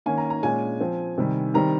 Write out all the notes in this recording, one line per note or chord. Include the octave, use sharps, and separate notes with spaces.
D#3 A#3 C#4 G#5
A#5
A#5
A#2 G#3 C#4 G#5
F3 C4
C3 D#3 G3
D#3 G3 C4 A#5